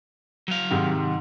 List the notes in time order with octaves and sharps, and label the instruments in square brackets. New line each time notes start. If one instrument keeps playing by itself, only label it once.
[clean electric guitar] F#3 F5
[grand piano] G#2 C3 D#3